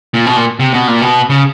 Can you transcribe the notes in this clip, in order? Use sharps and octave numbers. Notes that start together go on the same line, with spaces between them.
A#2
B2
A#2
C3
B2
A#2
B2
C#3